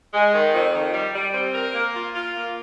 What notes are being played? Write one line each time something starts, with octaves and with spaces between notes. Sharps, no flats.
G#3
D#3
F2
D#3
G3
G3
C4
A#4
A#3
F4
F4
A#3